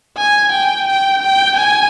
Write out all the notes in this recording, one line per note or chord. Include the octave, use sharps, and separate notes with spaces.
G#5
G5
G5
G5
G#5